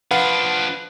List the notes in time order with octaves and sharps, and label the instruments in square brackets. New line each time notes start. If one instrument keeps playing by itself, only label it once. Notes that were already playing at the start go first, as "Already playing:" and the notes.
[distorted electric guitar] F3 D4 [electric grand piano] B4 F5 F#5